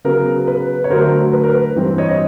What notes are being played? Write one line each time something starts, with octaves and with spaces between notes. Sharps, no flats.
C#3 F#3 B3 A#4
B4
C#5
D3 F#3 A3 A#4 C5
B4
A#4
B4
G2 E3 G3 C4
C#5 D#5
C#5 D#5